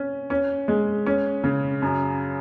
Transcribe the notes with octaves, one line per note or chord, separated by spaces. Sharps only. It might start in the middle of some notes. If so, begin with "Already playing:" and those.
Already playing: C#4
C#4
G#3
C#4
C#3
F#2